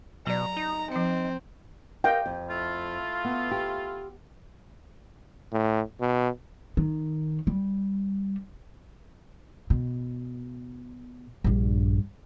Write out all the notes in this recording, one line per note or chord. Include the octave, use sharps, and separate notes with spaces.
B2 F#3 D5 A#5
D#4
F3 C4 D#5
A#4 D#5 F5 G5
F2
A3 E4 F4
B3
G4
A2
B2
D#3
G3
B2
A#1 G2